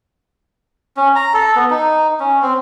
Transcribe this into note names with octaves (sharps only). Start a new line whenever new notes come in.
C#4
A#5
A4
B3
D#4
C#4
C4